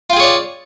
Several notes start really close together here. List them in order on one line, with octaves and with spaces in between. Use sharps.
F4 G5 G#4 C#5 D5